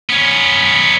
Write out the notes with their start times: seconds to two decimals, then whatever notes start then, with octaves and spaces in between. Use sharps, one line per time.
0.10 B3 C#4